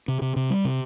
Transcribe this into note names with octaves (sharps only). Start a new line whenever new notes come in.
C3
C3
C3
G3
C3